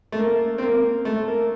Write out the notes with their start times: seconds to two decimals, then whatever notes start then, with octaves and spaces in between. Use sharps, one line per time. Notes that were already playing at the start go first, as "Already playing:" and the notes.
0.12 A3
0.19 A#3
0.58 C4
0.62 A#3
1.05 A3
1.28 A#3